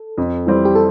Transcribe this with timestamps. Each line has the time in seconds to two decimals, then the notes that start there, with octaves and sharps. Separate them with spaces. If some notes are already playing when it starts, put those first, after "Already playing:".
Already playing: A4
0.18 F2
0.46 E3 G3 C4
0.65 G4
0.75 A4